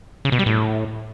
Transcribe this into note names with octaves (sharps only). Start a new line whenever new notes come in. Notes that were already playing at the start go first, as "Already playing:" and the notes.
C#3
B2
G3
A2